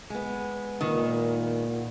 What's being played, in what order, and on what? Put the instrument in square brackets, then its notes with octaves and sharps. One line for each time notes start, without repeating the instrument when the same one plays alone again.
[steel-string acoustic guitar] G#3 B3
[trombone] A#2 [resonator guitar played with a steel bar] D#3